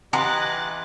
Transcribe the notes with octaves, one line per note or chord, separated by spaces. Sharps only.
E3 G4 D#5 F#5 A#5 C6 F#6 A6